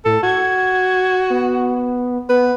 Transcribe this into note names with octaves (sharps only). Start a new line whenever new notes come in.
A2 A4
F#4 G#6
B3
B3 B4